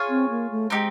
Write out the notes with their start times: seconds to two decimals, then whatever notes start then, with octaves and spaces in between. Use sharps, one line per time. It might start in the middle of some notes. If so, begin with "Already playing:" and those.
Already playing: F4 G#4 C#5
0.09 C4
0.30 A#3
0.51 A3
0.70 G#3 C4 D#4 G4